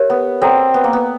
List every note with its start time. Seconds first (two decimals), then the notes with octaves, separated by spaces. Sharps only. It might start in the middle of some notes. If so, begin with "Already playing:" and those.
Already playing: G4 A#4 C#5 E5
0.10 B3
0.42 C4 F#4 A4 D5 F#5 A#5
0.74 B3
0.84 A#3
0.93 B3